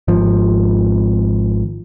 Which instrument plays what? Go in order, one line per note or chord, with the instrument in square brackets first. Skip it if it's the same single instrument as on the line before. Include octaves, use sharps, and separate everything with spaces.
[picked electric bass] G#1 F3